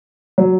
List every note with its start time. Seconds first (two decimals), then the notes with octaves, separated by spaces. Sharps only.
0.38 F#3